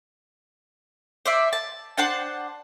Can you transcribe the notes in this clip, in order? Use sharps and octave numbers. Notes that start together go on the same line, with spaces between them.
C5 D5 E5
A5
D4 C5 F#5 A5